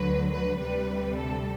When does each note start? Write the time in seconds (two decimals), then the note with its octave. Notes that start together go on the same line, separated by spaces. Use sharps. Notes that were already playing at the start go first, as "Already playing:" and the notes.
Already playing: D2 D3 F#3 B4
0.31 B4
0.59 D2 C3 G3 B4
1.17 A4